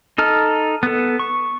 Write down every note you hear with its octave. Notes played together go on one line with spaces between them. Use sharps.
D#4 A4 F6
B3 A4
C#6